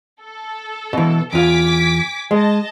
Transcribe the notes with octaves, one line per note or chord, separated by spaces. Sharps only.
A4
B2 E3
E2 F4 G#5 D6 B6
G#3 D#5 A5